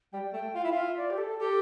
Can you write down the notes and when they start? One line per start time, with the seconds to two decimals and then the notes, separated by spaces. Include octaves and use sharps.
0.13 G3 G5
0.33 A3 G5
0.55 F4 F5
0.64 E4
0.72 F4 E5
0.97 D5
1.10 G4
1.18 A4
1.39 G4 A4